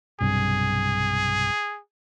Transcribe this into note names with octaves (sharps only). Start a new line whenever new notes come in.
B1 G2 C3 G#4